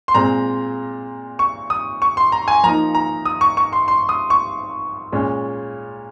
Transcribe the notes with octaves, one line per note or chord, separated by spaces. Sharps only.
C6
A#2 G#3 C4 A#5
C#6
D#6
C#6
C6
A#5
G#5
F3 A#3 D#4 A#5
A#5
D#6
C#6
C#6
C6
C6
D#6
C#6
A#2 G#3 C#4